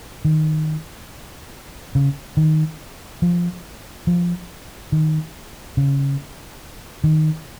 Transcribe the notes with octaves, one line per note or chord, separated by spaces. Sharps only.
D#3
C#3
D#3
F3
F3
D#3
C#3
D#3